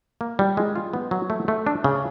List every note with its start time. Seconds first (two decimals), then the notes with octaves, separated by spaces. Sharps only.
0.21 A#3
0.39 G3
0.57 G#3
0.76 F4
0.93 B3
1.11 F#3
1.30 A3
1.48 A3
1.67 D4
1.84 C#3